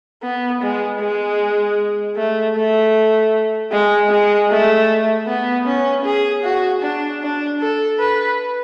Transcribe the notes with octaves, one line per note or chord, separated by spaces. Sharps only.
B3
G#3
G#3
A3
A3
G#3
G#3
A3
B3
C#4
G#4
F#4
D4
D4
A4
B4